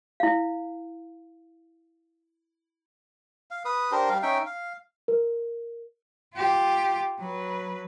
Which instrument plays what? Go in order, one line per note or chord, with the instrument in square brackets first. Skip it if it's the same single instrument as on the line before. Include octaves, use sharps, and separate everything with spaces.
[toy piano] E4 F5
[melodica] F5
B4 D#6
D4 G4 A#4 C5
G3 F5
C#4 D#4 E5 G5
F5
[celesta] A#4
[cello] F4 G4
F#3 B4